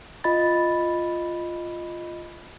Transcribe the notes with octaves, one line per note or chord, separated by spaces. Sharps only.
F4 D#5 B5 A6